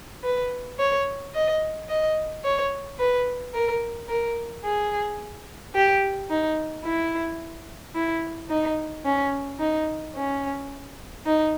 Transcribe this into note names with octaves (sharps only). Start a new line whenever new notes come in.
B4
C#5
D#5
D#5
C#5
B4
A#4
A#4
G#4
G4
D#4
E4
E4
D#4
C#4
D#4
C#4
D#4